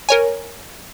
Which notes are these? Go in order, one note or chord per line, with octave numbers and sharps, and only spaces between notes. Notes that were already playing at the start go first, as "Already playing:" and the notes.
A#4 C#5 G#5